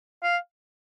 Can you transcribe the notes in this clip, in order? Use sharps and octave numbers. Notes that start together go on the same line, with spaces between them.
F5